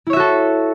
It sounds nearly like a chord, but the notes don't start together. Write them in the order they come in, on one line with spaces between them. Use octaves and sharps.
E4 C#5 E5 F#4 A4